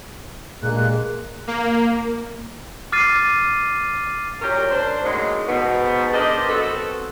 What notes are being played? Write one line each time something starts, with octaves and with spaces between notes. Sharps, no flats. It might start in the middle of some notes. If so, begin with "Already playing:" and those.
G2 A#2 G#3 A#3 F#6
A#3
D6 F6 A6 C7 D#7
F#2 A#2 G4 A#4 C#5
D4 C5
A2 C#3 F#3 G#3 A#3 D#4
G#2 B2 B3
D4 G4 A#4 C5 D#5
B3 C4 F#4 A4